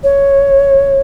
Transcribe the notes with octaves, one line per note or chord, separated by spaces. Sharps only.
C#5